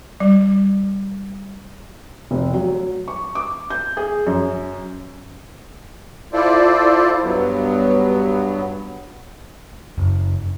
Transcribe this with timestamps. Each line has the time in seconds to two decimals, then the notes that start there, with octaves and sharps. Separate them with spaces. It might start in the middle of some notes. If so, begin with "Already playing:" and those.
0.20 G3
2.31 F1
2.53 F#3
3.08 C#6
3.35 D6
3.70 G6
3.97 G#4
4.27 F#2
6.33 E4 F4 A4 C5 D5
7.24 G2 F#3 B3
9.98 F#1